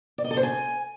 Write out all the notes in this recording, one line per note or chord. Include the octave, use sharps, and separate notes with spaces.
D5
D#5
A4
C5
G#5